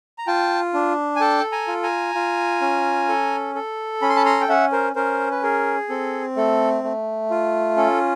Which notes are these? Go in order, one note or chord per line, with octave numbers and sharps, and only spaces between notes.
A#5
F4 G5 A5
D4
G#5
A4 G5 A5
G#5 A#5
F4
G#5 A#5
F4
C#4
A4
A4
C#4 B5
C6
A5 B5
A#5 C6
G5
C#4 E5 F#5
A#4 C5
C#4 A#4 C5
B4
G#4 A#4
C4 A4
A3 A4
A3
F4
C#4 A4